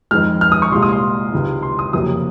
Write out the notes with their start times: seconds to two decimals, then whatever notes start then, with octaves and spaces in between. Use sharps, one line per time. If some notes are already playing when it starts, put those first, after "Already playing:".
0.11 F2 D#3 G#3 F6
0.41 F6
0.52 D#6
0.62 C#6
0.72 C2 A#2 G#3 C6
0.82 D#6
0.93 C6
1.33 C#2 C3 D#3 G#3
1.63 C6
1.79 D#6
1.93 F#1 F2 C3 F#3 A#3 D#6